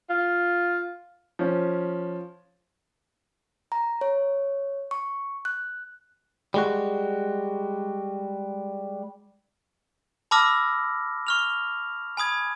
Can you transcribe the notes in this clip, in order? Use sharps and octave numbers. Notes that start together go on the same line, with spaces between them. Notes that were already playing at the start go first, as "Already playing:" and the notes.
F4
F3 C#4
A#5
C#5
C#6
F#6
G3 G#3 F#4
A5 B5 D6 E6 F6 A#6
C#6 F6 F7
G#5 B5 D#6 G#6